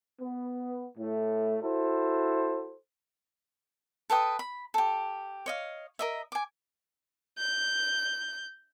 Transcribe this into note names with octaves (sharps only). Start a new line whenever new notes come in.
B3
A2 A3
E4 F#4 A4 C5
A4 B4 G5 D#6
B5
G4 A4
C#5 D#5 F5
A#4 D#5 E5
G#5 D6
G6